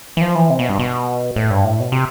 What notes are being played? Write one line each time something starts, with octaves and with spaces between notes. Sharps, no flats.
E3
F3
E3
C3
B2
G2
B2
A2
G2
A2
B2
C3